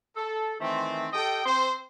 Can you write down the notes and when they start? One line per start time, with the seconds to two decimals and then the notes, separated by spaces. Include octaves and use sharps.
0.16 A4
0.59 D#3 E3 A3 C4
1.13 G4 A4 D#5 G5
1.45 C4 C5